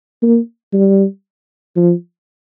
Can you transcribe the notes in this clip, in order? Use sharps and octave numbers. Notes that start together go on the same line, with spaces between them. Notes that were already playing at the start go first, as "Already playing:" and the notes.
A#3
G3
F3